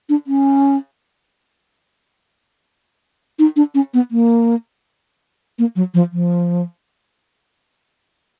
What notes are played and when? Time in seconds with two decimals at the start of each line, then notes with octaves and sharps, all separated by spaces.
0.09 D4
0.27 C#4
3.39 D#4
3.56 D4
3.75 C#4
3.94 B3
4.11 A#3
5.59 A#3
5.76 F#3
5.94 F3
6.12 F3